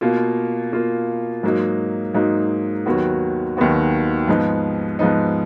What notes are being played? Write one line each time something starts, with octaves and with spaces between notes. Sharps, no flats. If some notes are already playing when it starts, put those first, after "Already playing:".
B2 A#3 F4
B2 A#3 F4
G#2 F#3 A#3 D#4
G#2 F#3 A#3 D#4
D#2 D#3 F#3 B3 F#4
D#2 D#3 F#3 B3 F#4
G#2 F3 B3 D#4
G#2 F3 B3 D#4